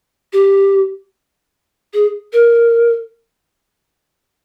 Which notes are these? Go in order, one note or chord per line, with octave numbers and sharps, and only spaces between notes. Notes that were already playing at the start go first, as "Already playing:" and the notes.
G4
G#4
A#4